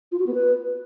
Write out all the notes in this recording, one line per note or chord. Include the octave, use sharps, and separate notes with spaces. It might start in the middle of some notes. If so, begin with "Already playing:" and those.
F4
F#4
B3
B4